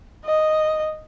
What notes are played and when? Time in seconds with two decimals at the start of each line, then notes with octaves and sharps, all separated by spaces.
0.25 D#5